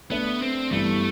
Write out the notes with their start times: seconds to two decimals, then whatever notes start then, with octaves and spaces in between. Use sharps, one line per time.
0.10 A3 B3 D4 A4 E5
0.42 C4
0.72 G2 E3 A3 B3 E4